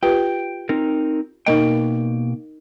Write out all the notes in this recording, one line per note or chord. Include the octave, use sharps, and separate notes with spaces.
F4 G4 B4 G5
C4 D#4 A#4
B2 A#3 D#4 A#4 D#5 G5